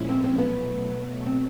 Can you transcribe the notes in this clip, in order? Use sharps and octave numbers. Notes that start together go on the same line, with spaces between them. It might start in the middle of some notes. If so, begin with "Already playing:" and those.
Already playing: A#2 F3 G#3 C#4 E4
C4
C4
B2 F#3 A3 B3
C4